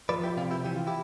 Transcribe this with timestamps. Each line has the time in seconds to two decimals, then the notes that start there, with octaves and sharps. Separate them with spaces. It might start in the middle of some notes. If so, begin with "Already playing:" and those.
0.09 F3 B4 D5
0.24 E4 G4
0.37 C3 F4
0.51 E4 G4
0.64 E3 G4
0.76 F4
0.87 E4 G4